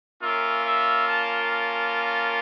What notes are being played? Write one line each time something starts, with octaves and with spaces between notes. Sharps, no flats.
A#3 C#4 F4 E5
E5
A5
A5